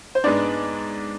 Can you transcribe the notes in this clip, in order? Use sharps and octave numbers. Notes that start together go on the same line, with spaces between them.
C5
G#2 G#3 B3 D4 D5